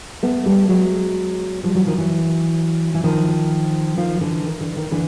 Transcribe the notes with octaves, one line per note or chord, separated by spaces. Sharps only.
A3 B3
G3 A3
F#3 G#3
F3 G3
E3 F#3
D#3 F3
E3 F#3
E3
D#3 F3
D#3 F3
D3 E3
D#3
D3 E3
D#3
D3 E3